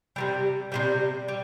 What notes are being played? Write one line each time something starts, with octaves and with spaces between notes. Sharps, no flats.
C3 D#3 G3
C3 D#3 G3
G3